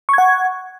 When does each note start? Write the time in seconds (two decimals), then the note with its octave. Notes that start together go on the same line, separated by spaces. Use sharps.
0.09 C#6
0.13 G#6
0.18 F#5